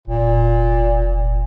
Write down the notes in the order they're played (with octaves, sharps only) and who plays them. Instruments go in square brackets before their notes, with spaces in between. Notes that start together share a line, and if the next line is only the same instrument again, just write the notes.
[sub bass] F1 [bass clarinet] A#2